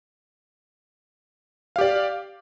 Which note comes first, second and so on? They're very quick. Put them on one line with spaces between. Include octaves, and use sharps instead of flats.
F5 G4 D5